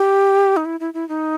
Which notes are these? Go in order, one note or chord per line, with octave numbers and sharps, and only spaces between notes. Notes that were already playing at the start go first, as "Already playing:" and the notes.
Already playing: G4
D#4
E4
E4
E4
D#4